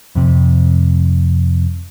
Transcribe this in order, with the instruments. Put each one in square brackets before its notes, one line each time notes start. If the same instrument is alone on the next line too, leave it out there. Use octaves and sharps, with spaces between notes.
[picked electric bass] F2 C3